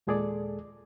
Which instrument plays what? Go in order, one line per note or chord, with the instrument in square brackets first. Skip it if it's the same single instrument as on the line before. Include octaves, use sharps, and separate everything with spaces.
[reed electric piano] D#2 A#2 G#3 G#4 A4 D5